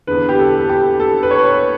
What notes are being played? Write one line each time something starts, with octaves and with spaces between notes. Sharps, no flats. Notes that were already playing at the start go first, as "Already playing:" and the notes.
E2 D3 B4
G4
A4
A4
G4
A4
B4
C#5
B4